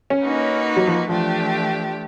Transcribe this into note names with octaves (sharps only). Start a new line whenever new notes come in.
C#4
A#3 D#4 F#4 B4
F#3
F3
E3 F3 A3 D4 G4